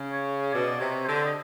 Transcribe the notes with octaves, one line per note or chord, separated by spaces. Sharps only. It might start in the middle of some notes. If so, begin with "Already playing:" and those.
Already playing: C#3
C#5
B2 D5
C3 C#5
D3 C5
D#5